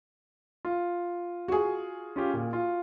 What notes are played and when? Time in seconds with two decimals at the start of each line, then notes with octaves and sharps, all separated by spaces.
0.65 F4
1.48 F#4 G#4
2.16 C#4 F4 G4
2.34 A#2
2.53 F4